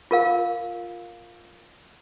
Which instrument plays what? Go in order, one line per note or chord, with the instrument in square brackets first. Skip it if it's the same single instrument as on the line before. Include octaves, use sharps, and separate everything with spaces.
[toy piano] F4 A#4 F5